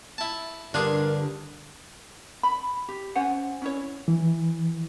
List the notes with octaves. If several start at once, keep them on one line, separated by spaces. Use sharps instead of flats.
E4 A5
G2 D3 D4 F4 G#4 A#4
B5
G4
C#4 C5 F#5 G#5
C#4 E4 C#5
E3